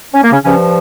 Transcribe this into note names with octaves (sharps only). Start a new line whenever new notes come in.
C#4
A#3
C#3 C#4
G2 C#3 F3 C#4